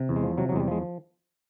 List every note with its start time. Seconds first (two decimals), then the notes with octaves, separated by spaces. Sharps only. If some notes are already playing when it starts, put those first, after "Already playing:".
Already playing: C3
0.09 E2
0.16 G#3
0.23 F3
0.38 C3 F#3
0.49 F#3
0.52 E2 G#3
0.60 G3
0.68 F3 G#3